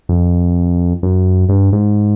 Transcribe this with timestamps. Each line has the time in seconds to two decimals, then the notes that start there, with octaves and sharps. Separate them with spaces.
0.09 F2
1.03 F#2
1.49 G2
1.73 G#2